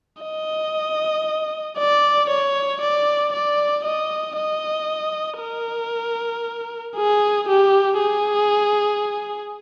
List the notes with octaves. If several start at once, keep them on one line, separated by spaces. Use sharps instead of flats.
D#5
D5
C#5
D5
D5
D#5
D#5
A#4
G#4
G4
G#4